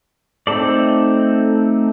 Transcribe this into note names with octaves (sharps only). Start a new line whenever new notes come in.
A3 C4 D#4 A4 D5